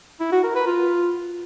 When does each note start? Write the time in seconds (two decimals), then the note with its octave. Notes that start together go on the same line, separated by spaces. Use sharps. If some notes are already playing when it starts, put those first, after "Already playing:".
0.21 E4
0.32 F#4
0.44 A#4
0.55 B4
0.67 F4